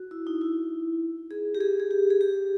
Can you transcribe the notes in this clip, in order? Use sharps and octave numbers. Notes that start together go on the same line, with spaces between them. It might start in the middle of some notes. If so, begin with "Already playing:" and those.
Already playing: F#4
E4
D#4
E4
G#4
G4
G#4
G#4
G4
G#4
G4